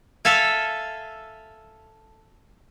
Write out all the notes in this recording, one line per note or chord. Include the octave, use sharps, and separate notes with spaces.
A4 E5 F5 G#5